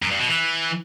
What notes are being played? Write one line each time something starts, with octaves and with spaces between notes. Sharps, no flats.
F#2
G2
B2
E3